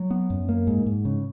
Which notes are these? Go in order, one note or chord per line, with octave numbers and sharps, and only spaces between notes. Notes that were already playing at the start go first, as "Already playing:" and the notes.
Already playing: F#3
B3
F#2
A#3
G#2
G#2
C#3